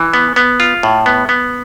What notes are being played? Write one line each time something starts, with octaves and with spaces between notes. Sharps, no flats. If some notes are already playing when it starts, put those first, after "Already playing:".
Already playing: E3
B3
B3
F4
A2
B3
B3